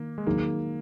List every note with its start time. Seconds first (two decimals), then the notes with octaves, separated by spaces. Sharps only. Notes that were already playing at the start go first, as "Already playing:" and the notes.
Already playing: D#3 A#3
0.18 G#3
0.26 D#3 F#3 A#3 D#4 G#4